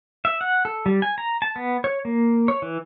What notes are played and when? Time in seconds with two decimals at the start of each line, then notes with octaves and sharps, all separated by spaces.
0.25 E5
0.41 F#5
0.65 A4
0.86 G3
1.02 G#5
1.18 A#5
1.42 A5
1.56 B3
1.84 C#5
2.05 A#3
2.48 C#5
2.62 E3